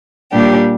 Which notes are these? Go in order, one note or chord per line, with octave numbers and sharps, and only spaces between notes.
A#2 G3 D4 G4